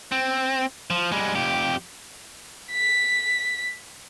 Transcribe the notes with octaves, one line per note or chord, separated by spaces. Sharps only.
C4
F3
G3 G#3
F2 G4
B6